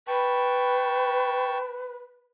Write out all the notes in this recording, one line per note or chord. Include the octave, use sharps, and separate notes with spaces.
B4 G5 A5 C#6